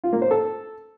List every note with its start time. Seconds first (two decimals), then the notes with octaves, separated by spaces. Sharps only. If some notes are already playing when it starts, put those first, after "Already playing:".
0.04 F4
0.13 A#3
0.22 C5
0.31 A4